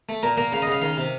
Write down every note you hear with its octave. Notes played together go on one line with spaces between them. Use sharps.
A3
A#2 A#4
A#3 A#4
C#3 F5
D#5
C#3 F5
D#3 F5
C3